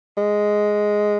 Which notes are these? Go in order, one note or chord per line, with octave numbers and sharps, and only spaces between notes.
G#3